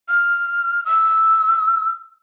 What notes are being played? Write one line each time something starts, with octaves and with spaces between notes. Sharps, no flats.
F6
E6